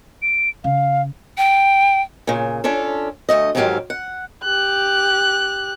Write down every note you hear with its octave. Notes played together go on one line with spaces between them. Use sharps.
D7
C#3 F5
G5
A#2 C#3
C#4 D4 F4 A4
D2 D#3 A3 D#5
F2 G#2 D#3 F#3 G4 F5
F#5
G4 F#6